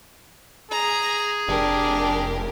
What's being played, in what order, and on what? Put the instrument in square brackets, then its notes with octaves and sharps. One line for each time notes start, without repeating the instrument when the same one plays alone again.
[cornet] G#4 [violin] A#5
[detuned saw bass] F1 [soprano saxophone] D4 [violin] G4 A#4